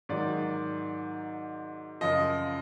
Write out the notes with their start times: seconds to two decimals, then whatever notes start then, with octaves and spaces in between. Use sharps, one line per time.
0.09 G#2 D#3 F#3 D5
2.01 F#2 C#3 F3 D#5